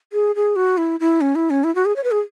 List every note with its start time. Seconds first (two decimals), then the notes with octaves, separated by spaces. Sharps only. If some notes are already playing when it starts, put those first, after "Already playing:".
0.13 G#4
0.36 G#4
0.56 F#4
0.77 E4
1.00 E4
1.21 C#4
1.35 E4
1.50 C#4
1.64 E4
1.75 F#4
1.85 G#4
1.96 C#5
2.04 B4
2.11 G#4